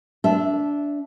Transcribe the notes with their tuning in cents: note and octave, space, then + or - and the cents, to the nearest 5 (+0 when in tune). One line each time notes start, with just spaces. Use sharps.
D4 -15 E5 +0